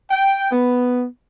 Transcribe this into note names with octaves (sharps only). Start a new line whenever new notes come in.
G5
B3